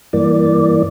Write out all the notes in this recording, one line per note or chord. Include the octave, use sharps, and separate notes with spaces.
G2 E3 A#3 D5